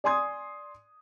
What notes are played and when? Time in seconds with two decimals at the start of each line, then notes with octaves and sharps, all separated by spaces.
0.04 D5 G#5 C6 D#6 G#6